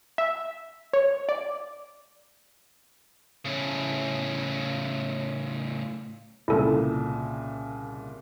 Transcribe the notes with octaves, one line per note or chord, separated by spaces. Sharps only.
E5
C#5
D5
A2 C#3
C2 A#2 C#3 E4 A4 A#4